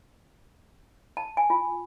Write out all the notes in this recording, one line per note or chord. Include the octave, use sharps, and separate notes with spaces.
A5
G#5
F4